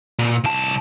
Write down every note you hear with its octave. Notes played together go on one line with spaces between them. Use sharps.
A#2
C2 A5